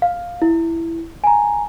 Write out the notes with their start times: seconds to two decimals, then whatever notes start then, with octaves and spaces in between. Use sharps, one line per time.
0.02 F5
0.42 E4
1.24 G#5 A#5